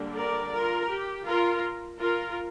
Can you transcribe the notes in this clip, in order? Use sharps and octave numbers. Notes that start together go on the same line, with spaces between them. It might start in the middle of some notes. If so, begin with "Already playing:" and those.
Already playing: D3 G3 A#3 D4
A#4 D5
F4 A#4
G4
F4 A#4
F4 A#4